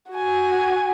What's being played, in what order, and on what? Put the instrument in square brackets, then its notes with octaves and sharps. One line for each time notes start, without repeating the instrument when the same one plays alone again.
[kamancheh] F#4 G#5